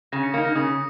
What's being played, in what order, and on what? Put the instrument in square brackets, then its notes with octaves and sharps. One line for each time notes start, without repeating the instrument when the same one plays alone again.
[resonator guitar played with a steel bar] C#3 [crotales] A#6
[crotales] C#7
[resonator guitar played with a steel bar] A#3 D#4 [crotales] C#7
[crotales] A#6
[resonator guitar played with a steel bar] C#3 [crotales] D#6